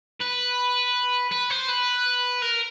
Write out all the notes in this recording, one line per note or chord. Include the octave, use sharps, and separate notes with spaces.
B4
B4
C5
B4
A#4